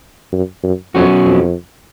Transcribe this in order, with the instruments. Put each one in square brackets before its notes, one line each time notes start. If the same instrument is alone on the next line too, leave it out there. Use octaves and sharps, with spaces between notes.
[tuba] F#2
F#2
[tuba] F2 [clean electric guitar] B2 F#3 C#4 F#4
[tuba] F2